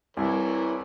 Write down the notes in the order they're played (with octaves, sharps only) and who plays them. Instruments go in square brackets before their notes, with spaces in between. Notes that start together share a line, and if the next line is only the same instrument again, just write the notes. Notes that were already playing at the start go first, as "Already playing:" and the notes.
[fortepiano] C2 [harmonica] E3 A#4 C#5 [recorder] E4